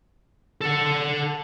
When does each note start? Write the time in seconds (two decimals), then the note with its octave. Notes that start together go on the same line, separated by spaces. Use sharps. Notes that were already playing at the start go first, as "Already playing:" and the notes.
0.61 A4 F#5